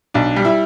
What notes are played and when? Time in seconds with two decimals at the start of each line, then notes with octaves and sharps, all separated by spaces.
0.14 B1 D4
0.36 G3
0.45 E4